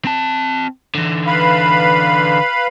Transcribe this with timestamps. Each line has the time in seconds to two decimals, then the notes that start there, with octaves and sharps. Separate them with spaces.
0.05 C4 A5
0.95 D3 E3
1.27 B4 F5 B5